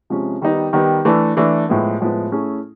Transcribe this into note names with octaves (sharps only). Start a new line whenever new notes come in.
C3 F3 G#3 C#4
D#3 G3 B3 D#4
D#3 G3 B3 D#4
E3 A3 D4
E3 A3 D4
A2 F3 G#3 B3
A2 F3 G#3 B3
A3 C#4 E4 G#4